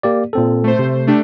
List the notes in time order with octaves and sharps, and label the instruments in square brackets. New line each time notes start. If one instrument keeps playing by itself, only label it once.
[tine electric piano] A#3 G4 D5
A#2 C4 A4
[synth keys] A3 C5
[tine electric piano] C3
[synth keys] A3 D4 G4